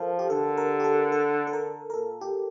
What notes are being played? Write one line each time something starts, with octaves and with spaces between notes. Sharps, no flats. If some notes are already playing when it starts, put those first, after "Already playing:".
Already playing: F3 A4 A#4
G4
D3 A4
A#4
G4
A4
A4
A4
A#4
A#4
A#2 A4
G4